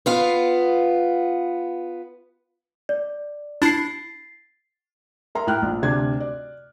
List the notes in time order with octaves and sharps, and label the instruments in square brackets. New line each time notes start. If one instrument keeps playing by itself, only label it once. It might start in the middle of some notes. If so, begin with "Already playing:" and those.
[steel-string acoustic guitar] B3 F4 F5
[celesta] D5
[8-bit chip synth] D4 E4 [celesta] A6 C7
[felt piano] A#4 E5 A#5 C6
A2 E4 G5 F6 F#6
A#1
D2 C3 D4 G#6
D5